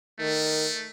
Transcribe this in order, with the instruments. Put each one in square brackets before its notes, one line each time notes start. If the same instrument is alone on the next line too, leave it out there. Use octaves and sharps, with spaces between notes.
[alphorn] D#3 [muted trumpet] A3